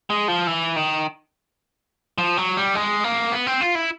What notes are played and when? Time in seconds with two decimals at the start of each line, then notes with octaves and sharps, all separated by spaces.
0.10 G#3
0.28 F3
0.47 E3
0.76 D#3
2.18 F3
2.37 F#3
2.57 G3
2.75 G#3
3.04 A#3
3.32 B3
3.47 C4
3.61 F4
3.75 E4